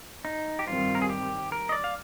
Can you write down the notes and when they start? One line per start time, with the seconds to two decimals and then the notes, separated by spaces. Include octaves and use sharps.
0.25 D#4
0.59 G4
0.67 G2 D#3 G3 C4 F4
0.95 A#4
1.02 G#4
1.09 G4
1.52 A#4
1.69 D#5
1.72 D5
1.84 F5